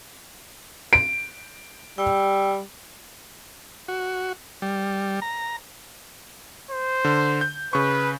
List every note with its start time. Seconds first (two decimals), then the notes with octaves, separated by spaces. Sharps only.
0.93 D7
1.98 G3 G5 E6
3.88 F#4
4.62 G3
5.22 A#5
6.71 C5
7.05 D3
7.41 G6
7.73 C#3 B4 C#6